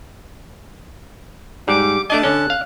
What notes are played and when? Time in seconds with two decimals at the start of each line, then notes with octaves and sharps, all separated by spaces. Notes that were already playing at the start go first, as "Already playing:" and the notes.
1.68 G#2 G3 D6
2.10 A3 D4 D#5 A5 D6
2.23 D3 C#4 F#6
2.50 F5